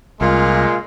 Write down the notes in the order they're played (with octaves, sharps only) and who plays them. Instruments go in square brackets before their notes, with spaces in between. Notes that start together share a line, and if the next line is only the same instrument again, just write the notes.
[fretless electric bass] C2 [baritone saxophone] A#2 [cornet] G#3 [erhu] F4